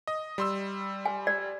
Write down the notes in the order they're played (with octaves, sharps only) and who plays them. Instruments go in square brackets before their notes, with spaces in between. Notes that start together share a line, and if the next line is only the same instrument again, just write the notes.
[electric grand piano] D#5
G3 C6 E6
[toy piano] G#5
D5